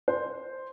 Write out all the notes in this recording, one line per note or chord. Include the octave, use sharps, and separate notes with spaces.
C5